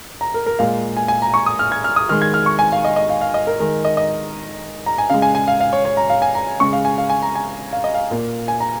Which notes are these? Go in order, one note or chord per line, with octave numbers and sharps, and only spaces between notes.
A#5
A#4
A#4
A#2 G#3 F5
G#5
G#5
A#5
C#6
D#6
F6
G#6
F6
D#6
D#3 G#3 F6
G#6
F6
C#6
G#5
F5
D#5
D#5
F5
F5
D#5
A#4
D#3 G#3 A#4
D#5
D#5
A#5
G#5
C#3 G#3 F5
G#5
G#5
F5
F5
C#5
C#5
A#5
F5
G#5
A#5
C#3 G#3 C#6
F5
G#5
F5
G#5
A#5
G#5
F5
D#5
F5
A#2 A#3
G#5
A#5